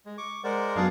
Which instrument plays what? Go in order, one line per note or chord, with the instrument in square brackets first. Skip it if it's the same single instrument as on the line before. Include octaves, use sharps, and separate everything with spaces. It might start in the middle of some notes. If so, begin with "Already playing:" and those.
[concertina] G#3
C#6 D6
[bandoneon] G#3 A#4 D5 [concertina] C5 F#5
[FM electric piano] F#2 F#3 B3 [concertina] D4 G#4 F5